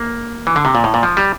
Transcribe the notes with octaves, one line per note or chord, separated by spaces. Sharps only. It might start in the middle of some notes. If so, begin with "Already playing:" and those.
Already playing: A#3
E3
D3
C3
A#2
A2
A#2
F3
G3